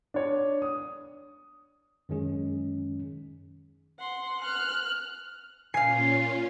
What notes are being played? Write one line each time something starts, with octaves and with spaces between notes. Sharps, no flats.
D4 C#5
D#6
F#2 D#3 G#3 C#4 G#4
F#5 C6
F6 F#6
A#2 C#4 F4 F5 G#5 C7